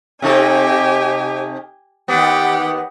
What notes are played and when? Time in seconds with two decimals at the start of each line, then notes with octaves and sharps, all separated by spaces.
0.22 C3 D#4 G4 A4 G#5
2.08 D#2 B3 G4 F#5